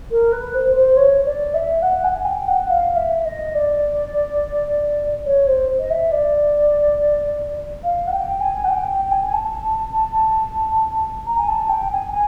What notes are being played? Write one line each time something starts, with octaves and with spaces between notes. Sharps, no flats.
A#4
B4
C5
C5
C#5
D5
E5
F#5
G#5
G5
F#5
F5
E5
D#5
D5
C#5
C5
D#5
E5
D5
F5
F#5
G5
G#5
F#5
G5
G5
G#5
G#5
A5
A#5
G#5
A5
G5
G#5
G#5